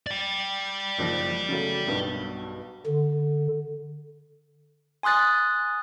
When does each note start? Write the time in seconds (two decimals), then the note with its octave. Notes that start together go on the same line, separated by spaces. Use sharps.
0.07 D5 G5
0.98 F#1 F3 A#6
1.49 C#3 F#3 A3
1.87 B1 G2 B2
2.87 D3
5.03 G#5 C6 D#6 F#6 A6